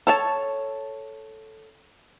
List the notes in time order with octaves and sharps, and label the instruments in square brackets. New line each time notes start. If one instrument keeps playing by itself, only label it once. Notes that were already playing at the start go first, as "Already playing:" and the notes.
[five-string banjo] A4 C#5 A5